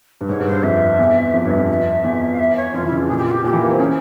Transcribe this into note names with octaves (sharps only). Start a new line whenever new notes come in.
G2
G#2 C#5
G2
C5
G2
F2 E5
E2
F2
G2 C#5
E5
F2
E2
F5
E5
C#5
F2 F4
E3
E4
C#3
F4
A#2 G#4
G4
F4
G4
A#2 G4
E3
A#3
C4
C#4 G#4